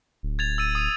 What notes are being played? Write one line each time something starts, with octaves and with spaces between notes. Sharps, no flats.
D1
G#6 A6 F7
E6 A6 D#7
D#6 D#7